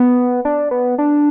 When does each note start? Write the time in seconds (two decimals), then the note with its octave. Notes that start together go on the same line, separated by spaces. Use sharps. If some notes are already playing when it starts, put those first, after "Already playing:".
Already playing: B3
0.45 D4
0.71 B3
0.98 D4